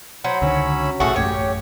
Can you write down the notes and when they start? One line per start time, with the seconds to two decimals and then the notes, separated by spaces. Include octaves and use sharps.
0.24 F#3 C5 B5
0.42 C#2 D3 D#3 C#4 B5 E6
1.00 B1 A2 A3 C#4 F#4 G#4 A4
1.16 A1 F#2 A3 G4 C#5